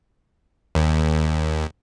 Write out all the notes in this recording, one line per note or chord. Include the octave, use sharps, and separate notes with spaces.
D#2